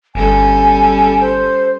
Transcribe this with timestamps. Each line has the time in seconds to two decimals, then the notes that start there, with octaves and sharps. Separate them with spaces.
0.15 G1 G3 C#4 A4 G#5
1.21 C5